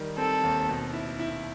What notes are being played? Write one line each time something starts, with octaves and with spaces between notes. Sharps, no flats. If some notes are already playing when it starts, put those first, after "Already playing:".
Already playing: D#3 G3
C4 A4
D#2
B2
E4
E4